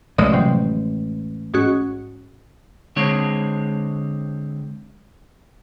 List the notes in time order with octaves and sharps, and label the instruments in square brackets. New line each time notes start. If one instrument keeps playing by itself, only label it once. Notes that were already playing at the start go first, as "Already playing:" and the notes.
[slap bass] A1 G#3 [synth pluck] D5 E5 D#6
[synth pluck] C3 F3 F#3
G#2 C#4 F#4
[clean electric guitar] D3 G#3 C4 C#5